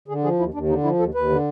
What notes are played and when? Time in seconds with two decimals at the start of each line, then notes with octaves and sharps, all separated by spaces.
0.08 D3 G#4
0.23 F3 G#4
0.39 D#2 E4
0.54 D#2 D4
0.69 D3 D#4
0.84 F3 E4
0.99 D#2 A4
1.14 D#2 B4
1.29 D3